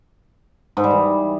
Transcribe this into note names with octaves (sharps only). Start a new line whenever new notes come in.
G#2
G3
E3